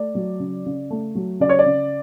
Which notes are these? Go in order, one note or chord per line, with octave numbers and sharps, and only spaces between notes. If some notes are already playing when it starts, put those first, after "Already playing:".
Already playing: A3 D5
F#3
C#3
C#3
A3
F#3
C#3 D5
C#5
D5
C#3